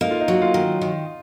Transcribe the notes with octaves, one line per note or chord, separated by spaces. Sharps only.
A#3 D#4
F4
D#4
F#3
F4
D#3
D#3